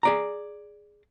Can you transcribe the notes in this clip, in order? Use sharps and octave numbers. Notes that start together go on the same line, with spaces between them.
G#4 D5 A#5